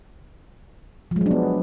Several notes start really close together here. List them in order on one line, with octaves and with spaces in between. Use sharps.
F3 G#3 F#3 D4 B3